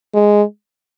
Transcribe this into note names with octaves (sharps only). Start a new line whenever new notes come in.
G#3